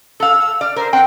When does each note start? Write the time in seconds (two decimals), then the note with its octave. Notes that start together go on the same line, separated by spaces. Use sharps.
0.20 A4 F5 E6
0.61 D5 F6
0.76 A#4 C5
0.93 C4 F#5 G5